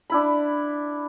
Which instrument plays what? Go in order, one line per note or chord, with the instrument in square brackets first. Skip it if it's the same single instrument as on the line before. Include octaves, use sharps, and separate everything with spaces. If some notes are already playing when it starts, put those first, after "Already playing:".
[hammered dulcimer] D4 E4 B5